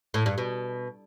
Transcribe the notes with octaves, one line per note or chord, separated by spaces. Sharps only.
A2
G2
B2